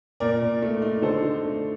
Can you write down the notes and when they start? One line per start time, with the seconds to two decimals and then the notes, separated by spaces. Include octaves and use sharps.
0.20 A#2 A#4 D5
0.42 A#2
0.62 A3
0.82 D#4
1.02 D3 A4 C5
1.23 D3
1.44 A3